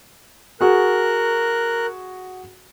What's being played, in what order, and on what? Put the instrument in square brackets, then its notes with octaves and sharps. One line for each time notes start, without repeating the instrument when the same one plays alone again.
[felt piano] F#4 G#4 [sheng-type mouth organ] A#4 F#6